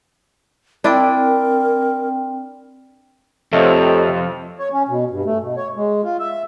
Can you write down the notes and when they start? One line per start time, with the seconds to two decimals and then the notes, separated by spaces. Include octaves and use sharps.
0.84 C4 D4 E4 A#4 D5 G5
3.53 F2 C3 A3 C#5 D#5 E5
4.58 C#5
4.73 C#4
4.89 B2
5.11 G2
5.25 A3
5.41 B2
5.57 C#5
5.76 G#3
6.04 F4
6.19 E5